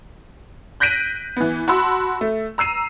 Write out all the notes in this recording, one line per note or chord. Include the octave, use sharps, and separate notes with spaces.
F#6 G6 A#6 B6 D7 D#7
E3 B3
F#4 A5 B5 C6 E6
A3
A#5 E6 C7 D#7